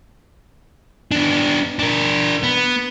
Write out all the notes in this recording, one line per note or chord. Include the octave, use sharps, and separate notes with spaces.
B3 D4
D4 A#4
B3